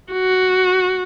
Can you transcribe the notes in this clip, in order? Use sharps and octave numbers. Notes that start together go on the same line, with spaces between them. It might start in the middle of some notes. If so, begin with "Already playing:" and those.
F#4